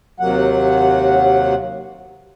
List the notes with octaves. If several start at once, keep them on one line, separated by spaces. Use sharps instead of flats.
D#2 C3 F#3 A#3 F#5